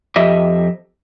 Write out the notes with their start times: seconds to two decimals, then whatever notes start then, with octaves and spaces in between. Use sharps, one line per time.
0.16 F2 G4 D#5 E5